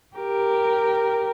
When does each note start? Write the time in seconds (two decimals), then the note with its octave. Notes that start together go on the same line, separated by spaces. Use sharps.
0.16 G4 A#4